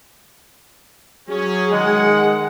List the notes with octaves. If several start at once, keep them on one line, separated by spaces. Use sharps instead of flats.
F#3 C#4 G#4
D#3 G#3 F#5